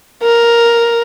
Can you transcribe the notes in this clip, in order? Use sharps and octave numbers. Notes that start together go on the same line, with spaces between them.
A#4